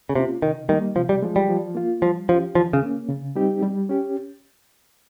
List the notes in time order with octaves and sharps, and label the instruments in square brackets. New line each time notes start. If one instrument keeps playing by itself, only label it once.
[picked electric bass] C#3
[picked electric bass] C3 [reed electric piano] A#3 C#4 F4
[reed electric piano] C3 [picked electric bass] D#3
[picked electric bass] D#3 [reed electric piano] G3
[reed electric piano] A#3
[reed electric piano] C3 [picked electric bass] F3
[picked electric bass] G3
[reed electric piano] F3 G#3
[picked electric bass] G3
[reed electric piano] F3
A#3 F4
[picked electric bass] F3 [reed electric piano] G3
[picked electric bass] F3 [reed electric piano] C#4 G4
[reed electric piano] D#3 [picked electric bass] F3
[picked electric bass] C#3
[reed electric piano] A#3 C#4
C#3
G3 C4 D#4 G4
G3
C#4 G4